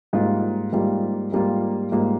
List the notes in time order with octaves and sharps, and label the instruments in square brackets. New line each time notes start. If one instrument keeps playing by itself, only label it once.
[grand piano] G#2 G3 A#3 F4
G#2 G3 A#3 F4
G#2 G3 A#3 F4
G#2 G3 A#3 F4